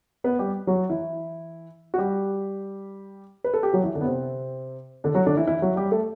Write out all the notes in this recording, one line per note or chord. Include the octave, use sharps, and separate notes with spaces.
B3 B4
G3 G4
F#3 F#4
E3 E4
F#4
G3 G4
B4
A4
G4
F#3 F#4
E3 E4
D3 D4
B3
C3 C4
D3 D4
F#3 F#4
D3 D4
E3 E4
E3 E4
F#3 F#4
G3 G4
A3 A4